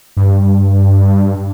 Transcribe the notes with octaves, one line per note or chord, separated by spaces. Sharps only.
G2